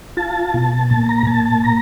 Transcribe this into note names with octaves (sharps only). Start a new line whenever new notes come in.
F4 A5
B2
A#2 A5
A#5
A#2 A5
A5
A#5